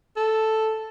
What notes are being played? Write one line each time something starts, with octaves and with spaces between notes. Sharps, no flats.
A4